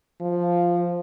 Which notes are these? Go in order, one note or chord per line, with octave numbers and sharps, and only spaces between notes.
F3